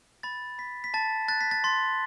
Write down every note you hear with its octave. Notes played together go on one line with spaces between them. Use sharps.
B5 A6
B5 B6
B6
A5 A6
F#6 A6
B6
A6
C6 A6